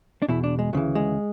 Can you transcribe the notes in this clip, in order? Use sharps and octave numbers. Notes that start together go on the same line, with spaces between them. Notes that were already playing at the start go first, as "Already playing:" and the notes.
D4
E2 B2 E4
D4
G#3
D2 C#3 E3 F#3
G#3